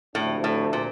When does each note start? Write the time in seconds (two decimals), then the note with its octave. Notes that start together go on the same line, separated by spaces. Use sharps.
0.14 D2 A2 C3 F3 A3 D4
0.44 A2
0.73 A#2